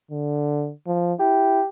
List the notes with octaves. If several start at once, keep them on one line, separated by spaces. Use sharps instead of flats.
D3
F3
E4 G4